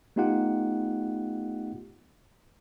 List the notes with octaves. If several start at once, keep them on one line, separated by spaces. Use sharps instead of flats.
A3 B3 D#4 F4 G4 F#5